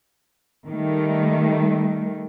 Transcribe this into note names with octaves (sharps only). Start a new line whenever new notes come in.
D#3 G3 A3